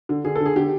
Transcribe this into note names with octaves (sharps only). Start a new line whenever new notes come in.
D3
D3 G#4
D3 A4
G#4
D3 G4